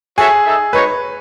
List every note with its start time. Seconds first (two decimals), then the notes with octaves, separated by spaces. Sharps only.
0.17 F#4 G#4 A4 C#5 E5
0.45 D#4 A4 E5
0.73 G#3 D#4 F#4 B4 C#5